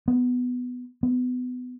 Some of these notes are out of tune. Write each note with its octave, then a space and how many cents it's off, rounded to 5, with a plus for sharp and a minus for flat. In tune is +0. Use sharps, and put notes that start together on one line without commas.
B3 +10
B3 +20